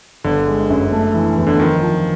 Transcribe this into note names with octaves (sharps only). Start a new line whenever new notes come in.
G1 D3
G#3
F#2
A3
E3
E2
D3
D#3 F3
F3